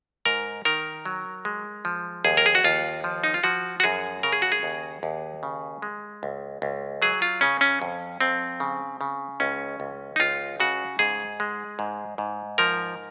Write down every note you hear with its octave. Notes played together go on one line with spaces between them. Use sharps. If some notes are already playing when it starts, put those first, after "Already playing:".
G#2 A#4
D#3 A#4
F#3
G#3
F3
D#2 G#4
A#4
G#4
F#4
D#2 F4
F3
D#4
F4
F3 F#4
F#4
F#2 G#4
C#3 A#4
G#4
F#4
G#4
D#2
D#2
C#3
G#3
C#2
C#2
F#3 G#4
F4
C#3 C#4
C#4
F2
F2 C4
C#3
C#3
C#2 C#4
C#2
D#4
C#2 F4
C#3 F#4
G#2 G#4
G#3
G#2
G#2
F3 A#4